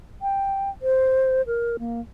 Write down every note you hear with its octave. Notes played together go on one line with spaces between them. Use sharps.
G5
C5
A#4
A#3